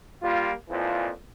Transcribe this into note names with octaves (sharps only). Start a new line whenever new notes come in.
G3 A#3 F4
F2 A#2 E3 F3